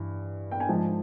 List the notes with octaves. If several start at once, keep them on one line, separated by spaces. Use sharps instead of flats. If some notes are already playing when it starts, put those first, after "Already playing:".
Already playing: G2 E3
G5
G#5
G#2 F3 A5